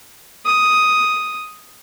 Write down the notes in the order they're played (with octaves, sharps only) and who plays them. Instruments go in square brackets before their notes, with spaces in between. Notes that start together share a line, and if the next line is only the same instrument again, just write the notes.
[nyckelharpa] D#6